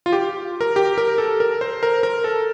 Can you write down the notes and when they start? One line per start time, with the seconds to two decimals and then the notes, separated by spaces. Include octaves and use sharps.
0.06 F4
0.12 G4
0.61 A#4
0.76 G4
0.98 A#4
1.18 A4
1.40 A#4
1.61 C5
1.83 A#4
2.03 A#4
2.24 A4